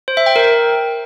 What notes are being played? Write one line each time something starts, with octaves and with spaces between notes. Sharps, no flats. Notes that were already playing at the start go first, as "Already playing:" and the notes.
C5
E5
G5
A#4